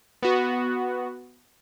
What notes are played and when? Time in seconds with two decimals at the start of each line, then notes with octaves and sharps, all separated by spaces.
0.23 B3 F#4